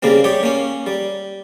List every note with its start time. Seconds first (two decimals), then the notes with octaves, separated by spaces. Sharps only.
0.03 C#3 G3 A#3 C4
0.24 G3 G4 C#5
0.43 A#3 C#4
0.87 G3